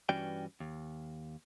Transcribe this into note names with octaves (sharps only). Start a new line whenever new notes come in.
G2 E3 C#4 F#4 D5 G5
D#2